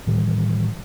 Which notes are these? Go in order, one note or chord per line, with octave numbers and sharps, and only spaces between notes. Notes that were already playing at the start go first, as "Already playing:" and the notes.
A2 D#3 E3 G3